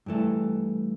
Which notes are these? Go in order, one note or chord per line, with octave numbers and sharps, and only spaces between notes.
G2 E3 A3